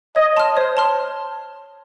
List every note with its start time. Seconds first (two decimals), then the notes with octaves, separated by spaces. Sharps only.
0.16 C#5 D#5
0.37 A5 C6 F6
0.56 C5 C#5
0.77 A5 C6 F6